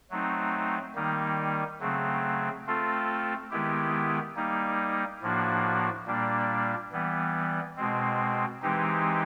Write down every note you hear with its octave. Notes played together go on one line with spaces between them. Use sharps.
F#3 A3 C4 D#4
D#3 G3 A#3 D#4
C#3 F#3 A3 C4
A3 C4 F4 A4
D#3 G#3 B3 E4 G4
G3 A#3 D#4
A2 F3 A#3 D4 F#4
A#2 G3 A#3 D4
E3 G3 B3
B2 G#3 C4
E3 G#3 C4 D#4 G4